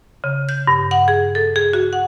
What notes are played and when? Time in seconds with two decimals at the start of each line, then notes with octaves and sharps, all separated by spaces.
0.24 C#3
0.49 G6
0.67 G2
0.91 F#5
1.08 G#4
1.35 A4
1.56 G#4
1.73 F#4
1.93 F#5